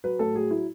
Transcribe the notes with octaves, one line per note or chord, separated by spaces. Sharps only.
F#3 B4
A2 A4
F#3 G#4
F#3 E4